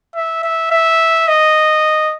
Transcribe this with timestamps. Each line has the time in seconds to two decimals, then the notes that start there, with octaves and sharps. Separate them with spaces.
0.15 E5
0.44 E5
0.71 E5
1.28 D#5